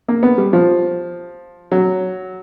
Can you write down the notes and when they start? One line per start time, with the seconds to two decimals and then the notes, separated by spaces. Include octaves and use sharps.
0.08 A#3
0.23 B3
0.38 G3
0.53 F3
1.72 F#3